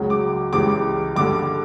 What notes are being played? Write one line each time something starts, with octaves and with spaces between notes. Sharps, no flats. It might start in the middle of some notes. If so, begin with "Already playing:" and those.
Already playing: C#2 C#3 F#3
D6
C#2 C#3 E3 G3 D6
G2 D3 G3 D6